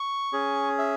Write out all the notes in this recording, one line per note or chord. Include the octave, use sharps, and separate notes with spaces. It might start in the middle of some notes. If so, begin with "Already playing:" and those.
Already playing: C#6
C#4 G#4
E5